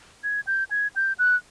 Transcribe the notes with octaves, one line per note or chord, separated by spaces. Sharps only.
G#6
G6
G#6
G6
F#6